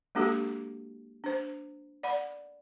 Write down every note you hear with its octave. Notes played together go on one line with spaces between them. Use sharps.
G#3 A#3 D4 F#4 G4 A4
D4 C5
D5 F#5 B5